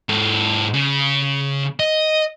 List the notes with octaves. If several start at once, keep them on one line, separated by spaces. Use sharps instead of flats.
G#2 A4
C#3
D#5